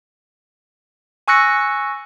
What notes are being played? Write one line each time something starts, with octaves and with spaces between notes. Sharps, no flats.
G#5 C#6 E6 F#6 A#6 C#7